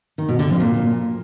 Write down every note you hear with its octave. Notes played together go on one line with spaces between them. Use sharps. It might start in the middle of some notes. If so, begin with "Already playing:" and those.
D#3
B2
D3
F2
A#2